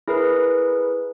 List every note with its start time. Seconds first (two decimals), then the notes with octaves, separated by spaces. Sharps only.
0.08 E4 G#4 A#4 B4